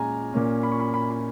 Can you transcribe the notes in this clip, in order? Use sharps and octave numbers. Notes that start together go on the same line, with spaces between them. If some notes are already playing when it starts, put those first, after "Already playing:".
Already playing: A#2 G#3 C#4 G#5 A#5
A#2 A#3 C#4
B5
C#6
B5
B5
B5